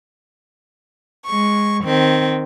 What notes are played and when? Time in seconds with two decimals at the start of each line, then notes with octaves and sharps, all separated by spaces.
1.27 G#3 C#6
1.84 D#3 C4